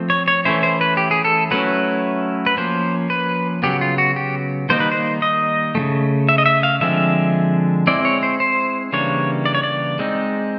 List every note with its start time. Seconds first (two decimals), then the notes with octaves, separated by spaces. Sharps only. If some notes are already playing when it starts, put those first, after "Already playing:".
Already playing: F3 A3 C4
0.10 C#5
0.28 C#5
0.45 E3 A3 C#4 E4 C5
0.63 C5
0.81 B4
0.97 G4
1.11 G#4
1.25 A4
1.51 F#3 A3 C#4 E4 B4
2.46 B4
2.57 F3 A#3 C#4 C5
3.10 B4
3.63 C#3 F#3 B3 G4
3.81 F4
3.98 F#4
4.16 G4
4.69 D#3 G3 A#3 D#4 C5
4.80 B4
4.92 C5
5.22 D#5
5.75 C#3 F3 A3
6.29 E5
6.38 D#5
6.46 E5
6.63 F5
6.81 D3 F3 G#3 C4 E5
7.87 G#3 C4 E4 D5
8.05 C#5
8.23 C5
8.40 C5
8.93 C#3 E3 G3 A#3 D4 C#5
9.46 D5
9.55 C#5
9.63 D5
9.99 G#3 C4 D#4